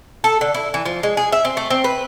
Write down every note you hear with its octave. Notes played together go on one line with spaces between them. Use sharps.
A4
D3
E4
E3
F3
G#3
G#4
E5
C4
A3
C4
B4